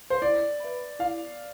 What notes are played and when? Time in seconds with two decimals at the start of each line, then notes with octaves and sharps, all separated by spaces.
0.10 C5
0.22 E4 D5
0.60 B4 E5 B5
0.99 E4 F5